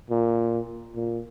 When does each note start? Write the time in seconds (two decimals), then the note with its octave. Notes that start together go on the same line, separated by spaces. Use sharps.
0.10 A#2
0.96 A#2